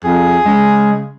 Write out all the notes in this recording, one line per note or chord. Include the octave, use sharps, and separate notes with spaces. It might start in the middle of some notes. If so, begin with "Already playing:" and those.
F2 G#4
C#3 G#3